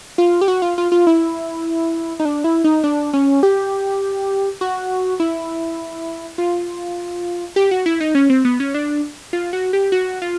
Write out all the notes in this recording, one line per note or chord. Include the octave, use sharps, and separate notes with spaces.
F4
G4
F#4
F4
F4
F4
E4
D#4
D4
E4
D#4
D4
C#4
G4
F#4
E4
F4
G4
F#4
E4
D#4
C#4
C4
B3
C#4
D4
F4
F#4
G4
F#4
F4